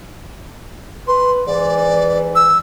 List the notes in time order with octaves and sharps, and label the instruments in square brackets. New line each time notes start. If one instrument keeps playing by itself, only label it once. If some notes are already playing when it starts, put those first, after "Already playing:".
[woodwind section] B4 [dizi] C6
[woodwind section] G#2 E3 [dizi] D5
[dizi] E6